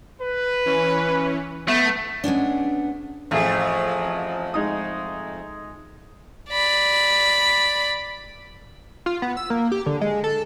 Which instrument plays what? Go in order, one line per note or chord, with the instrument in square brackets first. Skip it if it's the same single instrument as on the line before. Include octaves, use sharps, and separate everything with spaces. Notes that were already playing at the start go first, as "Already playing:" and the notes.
[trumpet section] B4
[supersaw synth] E3 C#4
[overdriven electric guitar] A3 [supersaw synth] B3
[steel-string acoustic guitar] G#3 B3 C#4 D4
[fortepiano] A1 G#4 [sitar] F2 A3
[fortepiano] G#3 D#4 D#6
[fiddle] D5 B5
[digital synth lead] F4
B3
E6
A#3
G4
D3
G#3
A4